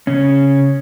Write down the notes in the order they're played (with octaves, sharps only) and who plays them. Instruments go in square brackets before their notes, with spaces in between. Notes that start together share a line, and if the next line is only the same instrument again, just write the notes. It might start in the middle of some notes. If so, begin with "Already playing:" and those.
[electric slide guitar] C#3 C#4